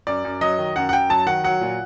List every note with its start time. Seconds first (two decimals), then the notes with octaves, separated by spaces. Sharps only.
0.07 F#2 D5
0.25 F#2
0.41 F#3 D#5
0.59 D#3
0.76 F#2 F#5
0.89 F#5
0.93 F#2 G5
1.10 F#3 A5
1.26 D#3 F#5
1.44 F#3 F#5
1.61 A#2